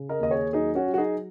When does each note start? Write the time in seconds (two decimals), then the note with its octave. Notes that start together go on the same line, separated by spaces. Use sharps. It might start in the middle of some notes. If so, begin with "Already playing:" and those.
Already playing: C#3
0.09 A#4 D#5
0.20 D#2 D#5
0.31 G#4 C#5
0.53 F#3 D#4 G#4
0.75 C#4 F#4
0.87 F#3
0.94 F#4
0.98 D#4 G#4